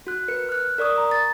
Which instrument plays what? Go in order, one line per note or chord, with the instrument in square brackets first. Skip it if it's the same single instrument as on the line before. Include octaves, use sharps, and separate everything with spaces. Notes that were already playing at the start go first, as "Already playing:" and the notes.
[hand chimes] F#4 F#6
A#4 B4 C#7
F6 F#6
A#4 D5 C#6 D#6
A#5
A6